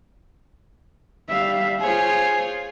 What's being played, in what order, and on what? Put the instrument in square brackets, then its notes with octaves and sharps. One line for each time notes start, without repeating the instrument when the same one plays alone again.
[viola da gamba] G3 [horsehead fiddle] E5 F5
[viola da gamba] F4 G#4 C#5 [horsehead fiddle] C5 [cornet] G#5